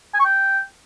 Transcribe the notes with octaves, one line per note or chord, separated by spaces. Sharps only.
G#5
C#6
G5